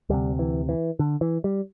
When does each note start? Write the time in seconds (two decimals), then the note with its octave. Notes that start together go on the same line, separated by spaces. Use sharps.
0.09 D2 C3 G3
0.39 E3
0.69 E3
0.99 D3
1.21 E3
1.44 G3